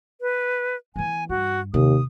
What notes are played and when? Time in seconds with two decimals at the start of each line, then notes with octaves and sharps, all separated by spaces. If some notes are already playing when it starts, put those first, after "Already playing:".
0.21 B4
0.96 E3 B3 G#5
1.29 G2 F#4
1.74 D#2 C3 D#6